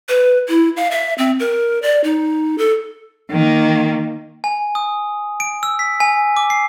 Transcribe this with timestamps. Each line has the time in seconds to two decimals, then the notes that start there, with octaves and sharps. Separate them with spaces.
0.09 B4
0.49 E4
0.77 F5
0.91 E5
1.18 C4
1.40 A#4
1.82 D5
2.04 D#4
2.58 A4
3.31 D#3 A#3
4.44 G#5
4.75 D#6
5.40 D7
5.63 E6
5.79 B6
6.00 G#5
6.37 D6
6.50 C7